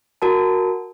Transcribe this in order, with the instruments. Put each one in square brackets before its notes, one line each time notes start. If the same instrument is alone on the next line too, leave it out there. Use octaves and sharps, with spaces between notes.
[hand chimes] F#4 A#4 A5